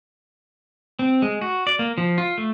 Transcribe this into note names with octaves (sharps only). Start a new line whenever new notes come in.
C4
G#3
F#4
D5
A#3
F3
F4
A3